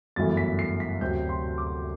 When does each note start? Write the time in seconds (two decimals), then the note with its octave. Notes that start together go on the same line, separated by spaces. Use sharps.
0.16 G1 F#2 E3 A3 A6
0.37 B6
0.59 C7
0.80 B6
1.01 D2 C3 F#3 C4 G6
1.29 C6
1.58 D6